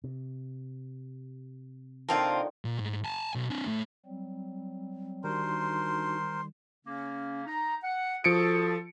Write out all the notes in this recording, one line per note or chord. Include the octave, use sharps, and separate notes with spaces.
C3
D3 D#3 F3 A#3 C4 F4 A5
A#2
G#2
G#5 A5
B1
C4 D4
A2
F#3 G3 C4
D#3 G3 D4 D#4 F#4 A#4 C5 C6
C#3 A#3 C#4
D#4 A#5
F#5
F3 F#4 G#4 A4 C#7 D7